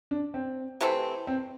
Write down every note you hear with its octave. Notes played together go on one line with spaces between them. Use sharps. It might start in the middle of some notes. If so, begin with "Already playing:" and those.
D4
C4
C3 E3 A3 C4
C4